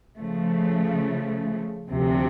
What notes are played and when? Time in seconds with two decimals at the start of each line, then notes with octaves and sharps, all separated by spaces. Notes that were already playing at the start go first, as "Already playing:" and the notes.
0.19 C#3 F3 A3
1.91 D2 C3 F3